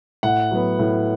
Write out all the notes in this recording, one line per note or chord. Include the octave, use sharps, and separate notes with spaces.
A2 F#5
F#3 B3
A2